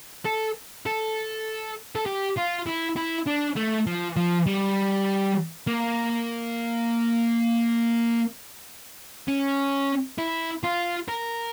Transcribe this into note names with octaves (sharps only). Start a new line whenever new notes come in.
A4
A4
A4
G4
F4
E4
E4
D4
A3
F3
F3
G3
A#3
C#4
E4
F4
A#4